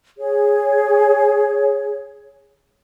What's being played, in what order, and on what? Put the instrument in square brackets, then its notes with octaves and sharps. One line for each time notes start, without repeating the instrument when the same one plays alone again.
[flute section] G#4 C#5